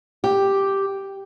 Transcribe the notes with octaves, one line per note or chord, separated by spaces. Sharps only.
G4